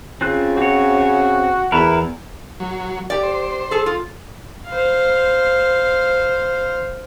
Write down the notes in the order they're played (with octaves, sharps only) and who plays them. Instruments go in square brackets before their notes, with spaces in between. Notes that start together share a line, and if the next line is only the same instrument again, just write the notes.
[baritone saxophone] C#3 [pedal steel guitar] C4 F4 F#6
[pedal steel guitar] C4 C#5 [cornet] F#4
[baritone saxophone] E2 [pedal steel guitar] E4 A#4 B4
[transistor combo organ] F#3
[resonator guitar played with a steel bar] G4 D5
[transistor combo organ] C5
[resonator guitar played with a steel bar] G#4 A4
F4
[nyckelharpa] C5 F5